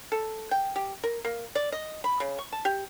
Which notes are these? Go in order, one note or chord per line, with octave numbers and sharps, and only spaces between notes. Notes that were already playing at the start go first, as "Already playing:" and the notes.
A4
G5
G4
A#4
A#3
D5
D#5
B5
C#3
C#6
A5
G4